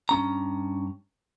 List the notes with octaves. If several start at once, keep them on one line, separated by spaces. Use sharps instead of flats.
G2 C#4 A#5